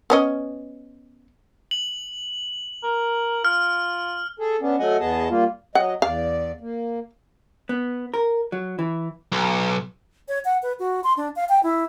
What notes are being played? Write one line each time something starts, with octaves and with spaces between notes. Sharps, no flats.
B3 C#4 D#5
F#7
A#4
F4 F6
G#4 A4
B3 C#4 D4
F#3 A3 D#5 F#5 G#5
E2 B3 G#4 D#5 A5
G3 A#3 F4
F#3 D#5 F#5
E2 D5 F5
A#3
B3
A#4
F#3
E3
B1
C#5
F#5
B4
F#4
C6
D4
F5
G5
E4